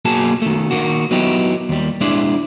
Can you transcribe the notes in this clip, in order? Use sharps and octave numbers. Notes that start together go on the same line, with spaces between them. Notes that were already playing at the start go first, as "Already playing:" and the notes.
B1 A#3 F#4 G#4 G#5 A5
D#3 A3
D#3 A#3 F#4
F#3 B3 D#4 E4 G4
D#2 G3
G#3 D4 E4 C5 D5